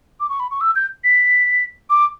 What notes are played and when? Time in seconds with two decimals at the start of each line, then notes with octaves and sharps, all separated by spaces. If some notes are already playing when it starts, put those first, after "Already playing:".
0.20 D6
0.29 C#6
0.40 B5
0.51 C#6
0.61 E6
0.75 G6
1.04 B6
1.90 D6